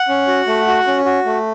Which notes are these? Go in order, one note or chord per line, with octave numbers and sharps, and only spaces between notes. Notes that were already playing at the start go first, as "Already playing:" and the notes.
Already playing: F#5
C#4
F#4
A3
F#4
C#4
F#4
A3